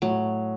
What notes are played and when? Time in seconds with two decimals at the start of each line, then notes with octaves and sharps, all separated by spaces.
0.02 A2 F#3